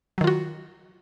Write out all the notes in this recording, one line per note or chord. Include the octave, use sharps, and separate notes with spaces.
D#3 F#3 F4 F#4